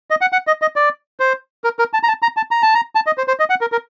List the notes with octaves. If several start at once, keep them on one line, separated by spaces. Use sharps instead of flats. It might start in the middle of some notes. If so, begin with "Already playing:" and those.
D#5
F#5
F#5
D#5
D#5
D5
C5
A#4
A#4
A5
A#5
A5
A#5
A5
A#5
A5
A#5
A5
D#5
C5
C5
D#5
F#5
A#4
A#4